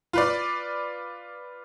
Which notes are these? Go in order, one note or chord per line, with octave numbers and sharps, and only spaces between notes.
F4 B4 D5